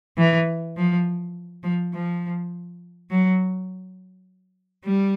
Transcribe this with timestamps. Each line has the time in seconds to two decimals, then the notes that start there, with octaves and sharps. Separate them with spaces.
0.18 E3
0.77 F3
1.63 F3
1.94 F3
3.10 F#3
4.85 G3